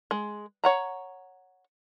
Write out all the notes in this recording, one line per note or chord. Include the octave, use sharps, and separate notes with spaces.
G#3
C#5 F#5 A#5